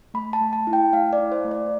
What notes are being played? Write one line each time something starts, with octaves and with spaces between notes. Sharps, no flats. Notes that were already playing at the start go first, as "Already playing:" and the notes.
A3 B5
A5
A3
A5
E4
G5
A3 F5
D5
E4
C5
A3
D5